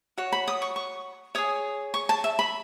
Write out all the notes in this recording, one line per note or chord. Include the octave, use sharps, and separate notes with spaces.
F#4 C#5
B5
D#6
C#6
C#6
G#4 C#5 D#6
C#6
A5
E5
B5